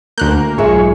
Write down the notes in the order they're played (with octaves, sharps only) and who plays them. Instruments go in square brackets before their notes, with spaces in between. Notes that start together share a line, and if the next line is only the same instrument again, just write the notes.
[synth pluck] D2 F#6 G6 [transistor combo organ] A#3
[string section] B1 [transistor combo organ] G#2 C#5 [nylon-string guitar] F4 G#4 E5